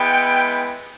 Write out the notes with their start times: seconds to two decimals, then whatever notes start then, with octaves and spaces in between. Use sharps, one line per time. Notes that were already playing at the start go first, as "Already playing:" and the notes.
Already playing: G#3 B3 E4 G5